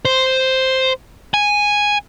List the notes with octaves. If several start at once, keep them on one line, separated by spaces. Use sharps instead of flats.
C5
G#5